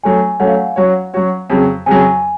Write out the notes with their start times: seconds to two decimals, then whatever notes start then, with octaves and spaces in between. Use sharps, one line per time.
0.04 F#3 A3 C#4 G#5
0.40 F#3 A3 C#4 F#5
0.47 F5
0.54 F#5
0.76 F#3 C#4 F#4 C#5
1.14 F#3 C#4 F#4 C#5
1.50 F2 C#3 F#3
1.86 F2 C#3 F#3 G#5